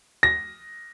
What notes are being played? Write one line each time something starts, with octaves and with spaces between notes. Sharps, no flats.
A#6